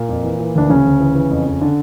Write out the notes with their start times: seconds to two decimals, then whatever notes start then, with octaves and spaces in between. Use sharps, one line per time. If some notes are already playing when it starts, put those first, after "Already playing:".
Already playing: A#2 A#3
0.09 F2
0.24 E3
0.40 E3
0.55 D2 D4
0.70 D2 C#3 C#4
0.85 D2
1.00 E3
1.15 E3
1.31 F2
1.46 F2
1.61 D3 D4